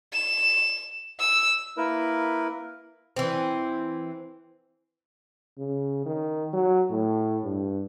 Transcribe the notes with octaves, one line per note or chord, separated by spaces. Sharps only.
E7
E6
A#3 E4 A#4 B4
E3 C4
C#3
D#3
F#3
A2
G2